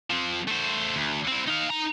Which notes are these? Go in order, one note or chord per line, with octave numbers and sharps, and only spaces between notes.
F3 C4
A3 C5
D2
C4 E4
D#4 F5
D#4 A#5